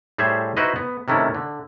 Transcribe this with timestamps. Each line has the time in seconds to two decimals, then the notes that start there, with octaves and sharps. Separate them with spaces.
0.18 A2 G3 G#4 C5 E5 G#5
0.57 D#4 E4 F#4 B4 C5 D#5
0.76 B3
1.08 C3 D#3 A3 C#4 E4
1.35 D3